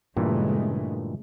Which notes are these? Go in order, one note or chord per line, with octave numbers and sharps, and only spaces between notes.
G2 A#2 C#3 E3 G#3 A3